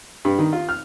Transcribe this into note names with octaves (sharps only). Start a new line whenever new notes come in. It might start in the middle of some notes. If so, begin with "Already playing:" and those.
G2
D#3
F4
F6